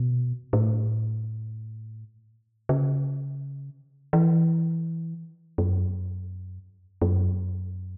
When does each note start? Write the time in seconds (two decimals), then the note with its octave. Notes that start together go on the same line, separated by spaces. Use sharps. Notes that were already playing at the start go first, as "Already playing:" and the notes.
Already playing: B2
0.53 A2
2.69 C#3
4.13 E3
5.58 F#2
7.02 F#2